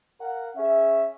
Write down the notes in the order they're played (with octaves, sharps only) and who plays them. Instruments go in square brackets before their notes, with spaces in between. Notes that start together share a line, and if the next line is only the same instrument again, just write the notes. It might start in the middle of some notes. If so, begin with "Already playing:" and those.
[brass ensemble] A#4 F5 F#5
C#4 G#4 E5